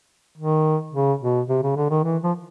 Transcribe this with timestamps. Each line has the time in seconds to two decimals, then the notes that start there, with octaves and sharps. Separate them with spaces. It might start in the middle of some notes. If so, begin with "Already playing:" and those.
0.38 D#3
0.93 C#3
1.21 B2
1.49 C3
1.63 C#3
1.76 D3
1.90 D#3
2.04 E3
2.23 F3